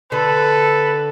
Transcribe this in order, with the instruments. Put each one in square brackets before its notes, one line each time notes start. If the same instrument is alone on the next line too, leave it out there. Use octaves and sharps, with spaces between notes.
[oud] D3 [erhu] A4 [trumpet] B4